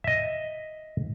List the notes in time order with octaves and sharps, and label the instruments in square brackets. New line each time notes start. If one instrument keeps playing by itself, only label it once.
[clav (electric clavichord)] D#5 E5